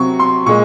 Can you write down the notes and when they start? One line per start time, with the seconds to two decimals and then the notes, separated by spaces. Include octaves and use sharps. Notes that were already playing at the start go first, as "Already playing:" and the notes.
Already playing: C3 F#3 C4 C#6
0.19 C6
0.46 A#2 G#3 C#6